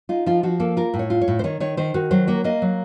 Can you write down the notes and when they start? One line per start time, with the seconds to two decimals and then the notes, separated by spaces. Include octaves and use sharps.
0.09 D#4 F4
0.26 F3 F4
0.43 F3 F#4
0.60 A#3 A4
0.77 F4 A#4
0.94 A2
0.99 C#5
1.10 F4
1.21 C#5
1.28 A2
1.39 C5
1.44 D#3 C#5
1.60 D#3 C#5
1.77 D#3 C5
1.94 D#3 F#4
2.11 F#3 C5
2.27 A#3 C#5
2.44 A#3 D#5
2.62 F#3